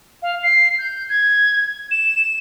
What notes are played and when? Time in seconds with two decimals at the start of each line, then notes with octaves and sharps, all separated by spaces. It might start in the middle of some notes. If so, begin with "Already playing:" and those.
0.22 F5
0.43 C7
0.79 G6
1.09 G#6
1.91 E7